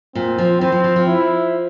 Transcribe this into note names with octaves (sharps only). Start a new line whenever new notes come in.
A#2 C4
F3
E3 C4
F3
F3
F3
E4